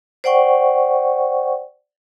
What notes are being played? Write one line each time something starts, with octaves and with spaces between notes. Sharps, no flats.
C5 D5 F#5 G5 C#6